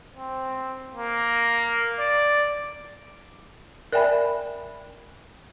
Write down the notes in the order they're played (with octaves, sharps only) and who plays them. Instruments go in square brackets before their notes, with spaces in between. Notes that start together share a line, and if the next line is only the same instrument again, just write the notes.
[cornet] C4
A#3
D5
[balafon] A#4 D5 E5 G5 G#5 B5